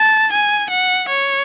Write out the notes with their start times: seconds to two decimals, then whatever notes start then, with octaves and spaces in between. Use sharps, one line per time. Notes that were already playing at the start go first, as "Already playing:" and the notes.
Already playing: A5
0.32 G#5
0.70 F#5
1.08 C#5